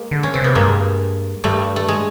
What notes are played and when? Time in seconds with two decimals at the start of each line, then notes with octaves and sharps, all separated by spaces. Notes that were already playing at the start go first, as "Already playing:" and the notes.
Already playing: G#3 A#3
0.11 D3
0.23 C#4
0.34 C#3 C4
0.42 C3 B3
0.55 G2 G#3 A#3
1.44 G2 G3 A3
1.76 A3
1.88 G#3